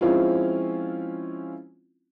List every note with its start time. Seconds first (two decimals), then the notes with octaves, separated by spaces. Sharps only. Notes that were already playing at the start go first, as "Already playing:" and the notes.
0.01 F3 G#3 C4 C#4 E4 F4